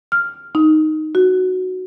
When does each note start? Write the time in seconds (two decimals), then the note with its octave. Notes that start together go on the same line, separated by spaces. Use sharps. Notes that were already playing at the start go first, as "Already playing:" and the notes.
0.12 F6
0.55 D#4
1.15 F#4